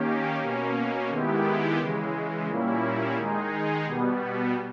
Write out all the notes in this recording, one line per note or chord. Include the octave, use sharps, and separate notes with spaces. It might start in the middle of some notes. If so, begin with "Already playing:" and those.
Already playing: D#3 A#3 C#4 G4
B2 A#3 C#4
D#3 G#3 B3 E4 G4
C#3 E3 G#3
A#2 G3 A#3 C#4 E4
D#3 G#3 D#4 G#4
B2 G3 B3